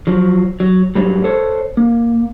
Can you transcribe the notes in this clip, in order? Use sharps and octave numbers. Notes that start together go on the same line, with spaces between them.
F3 F#3
F#3
G#2 F#3 G3
A4 C5 C#5
A#3